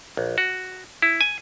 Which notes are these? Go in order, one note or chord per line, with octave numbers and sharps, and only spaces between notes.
A#1
F#4
E4
G#5